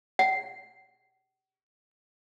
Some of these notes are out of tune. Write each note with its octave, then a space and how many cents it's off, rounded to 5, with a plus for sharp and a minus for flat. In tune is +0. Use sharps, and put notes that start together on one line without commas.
F#5 +45